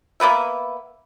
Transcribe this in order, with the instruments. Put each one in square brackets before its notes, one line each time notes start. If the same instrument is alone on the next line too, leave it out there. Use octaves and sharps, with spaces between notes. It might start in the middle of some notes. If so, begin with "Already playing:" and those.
[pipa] A#3 B3 B4 E5